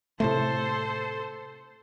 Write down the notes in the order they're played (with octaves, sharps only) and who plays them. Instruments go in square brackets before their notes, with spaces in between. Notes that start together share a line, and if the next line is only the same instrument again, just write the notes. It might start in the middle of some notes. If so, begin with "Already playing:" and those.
[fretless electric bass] A2 C3 A3 [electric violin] A4 C5